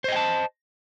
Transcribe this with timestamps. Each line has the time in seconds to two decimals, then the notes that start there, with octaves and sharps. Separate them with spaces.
0.04 C5
0.08 D#5
0.12 G5
0.16 A5